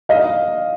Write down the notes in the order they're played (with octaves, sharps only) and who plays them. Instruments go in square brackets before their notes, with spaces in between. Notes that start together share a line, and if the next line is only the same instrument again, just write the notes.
[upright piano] D#5 F5